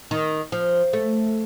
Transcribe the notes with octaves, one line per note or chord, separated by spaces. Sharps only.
D#3
F3
A3